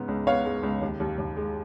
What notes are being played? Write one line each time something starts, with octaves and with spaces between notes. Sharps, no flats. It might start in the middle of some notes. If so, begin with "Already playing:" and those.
Already playing: G#2 C#3 B3
C#2
B3 C#5 F5
G#3
C#2
D#2
D#2
D#2
G#3